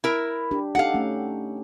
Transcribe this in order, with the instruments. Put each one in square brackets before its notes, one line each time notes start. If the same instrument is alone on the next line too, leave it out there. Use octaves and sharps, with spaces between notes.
[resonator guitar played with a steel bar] E4 A#4
[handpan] D4 G4
[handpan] D#4 G4 A4 [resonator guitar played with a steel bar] F5 F#5
[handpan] A3 C#4